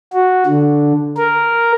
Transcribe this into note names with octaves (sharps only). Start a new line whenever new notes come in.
F#4
D3
A#4